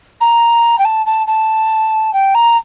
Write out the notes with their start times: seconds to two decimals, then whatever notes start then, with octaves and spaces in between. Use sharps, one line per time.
0.21 A#5
0.79 G5
0.85 A5
1.06 A5
1.27 A5
2.13 G5
2.35 A#5